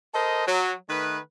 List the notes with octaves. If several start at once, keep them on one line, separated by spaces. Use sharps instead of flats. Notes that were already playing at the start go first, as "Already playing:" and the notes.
A4 A#4 C5 D#5
F#3
D#3 A3 B4